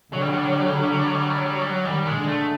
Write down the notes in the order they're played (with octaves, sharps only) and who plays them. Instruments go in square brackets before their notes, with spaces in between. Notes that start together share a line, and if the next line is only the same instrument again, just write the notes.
[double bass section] D3 [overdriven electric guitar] F#3
[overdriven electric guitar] G3
F#3
G3
F#3
G3
F#3
G3
F#3
G3
F#3
G3
F#3
G3
F#3
G3
F#3
G3
F#3
G3
F#3
[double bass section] D#3 [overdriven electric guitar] G3
[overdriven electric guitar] G#3
[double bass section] D3
[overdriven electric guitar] A3